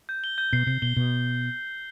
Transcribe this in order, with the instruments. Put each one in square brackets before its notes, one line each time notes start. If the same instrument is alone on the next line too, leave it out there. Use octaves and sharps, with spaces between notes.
[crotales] G6
G7
G6
[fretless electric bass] B2 [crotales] C7
[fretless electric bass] C3 [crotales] C7
[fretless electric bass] B2 [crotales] G7
[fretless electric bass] B2 [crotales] G7